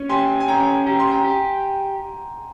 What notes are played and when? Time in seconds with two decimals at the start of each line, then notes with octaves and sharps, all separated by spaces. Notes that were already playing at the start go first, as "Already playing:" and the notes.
Already playing: C#4
0.09 G4 G#5 C6
0.40 G#5
0.48 C#4 G5 A#5
0.86 G4 A#5
0.99 C6
1.11 G5 A#5
1.24 G4